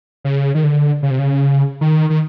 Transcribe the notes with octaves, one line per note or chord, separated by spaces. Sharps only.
C#3
D#3
D3
C#3
C3
C#3
D#3
D#3